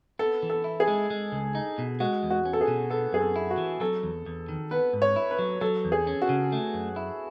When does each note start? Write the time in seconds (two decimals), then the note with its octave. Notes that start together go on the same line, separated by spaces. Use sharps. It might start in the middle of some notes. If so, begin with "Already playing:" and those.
0.19 B3 A4
0.43 E3
0.50 A4
0.64 E4
0.80 G#4
0.87 G#3
1.10 G#3
1.32 C#2
1.55 D#4
1.78 B2
2.00 G#3 F#4
2.23 E2
2.30 F#4
2.45 C#4
2.53 A4
2.61 G#4
2.67 B2
2.90 B3 A4
3.13 F#2 G#4
3.21 A4
3.36 E4
3.51 F#4
3.58 E3
3.80 F#3 A4
4.03 E2
4.26 E2
4.49 D#3
4.71 B3 B4
4.93 G#2
5.02 C#5
5.16 E4
5.31 B4
5.39 F#3
5.61 F#3 A4
5.85 E2
5.92 G#4
6.07 C#4
6.22 F#4
6.29 C#3
6.52 A3
6.74 F#2
6.96 E4